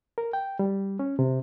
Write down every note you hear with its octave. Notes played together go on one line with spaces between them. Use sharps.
A#4
G5
G3
C#4
C3